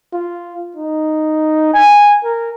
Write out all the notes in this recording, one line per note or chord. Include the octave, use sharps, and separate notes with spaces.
F4
D#4
G#5
A#4